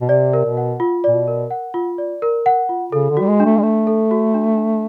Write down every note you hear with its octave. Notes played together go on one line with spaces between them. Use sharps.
B2
C3 D5
A#4
B2
F#5
F4
A#2 D5
B2
A#4
F#5
F4
D5
A#4
F#5
F4
C#3 A4
D3
G3 F#4
G#3
D4
A3
G#3
A3 D4
A4
F#4
D4
D4